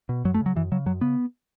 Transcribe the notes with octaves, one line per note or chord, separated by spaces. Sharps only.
B2
F#2 F#3
A3
C#3
F#3
F#2 E3
C#3 F#3
F#2 F#3
C#3 B3